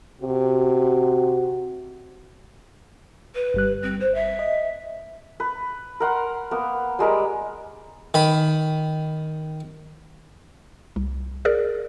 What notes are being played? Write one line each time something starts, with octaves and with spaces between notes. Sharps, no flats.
C3 F#4
B4
G1 G3 F#6
C4
C5
E5
D#5
B4
A#4 F#5 C6
A#3 B3 A#4
G3 G#3 A#4 B5
D#3 B5
C2
G#4 A#4 D5